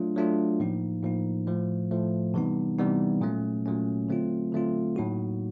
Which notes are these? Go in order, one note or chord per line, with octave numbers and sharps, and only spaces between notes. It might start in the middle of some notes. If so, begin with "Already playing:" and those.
Already playing: F#3 A3 D4 F4
F#3 A3 D4 F4
A2 F3 A#3 D#4
A2 F3 A#3 D#4
A2 F3 A3
A2 F3 A3
C3 E3 G3 B3 D#4
C3 E3 G3 B3 D#4
A#2 F#3 A3 C#4
A#2 F#3 A3 C#4
D3 F#3 A3 C4 F4
D3 F#3 A3 C4 F4
A2 F#3 A#3 D#4 F#4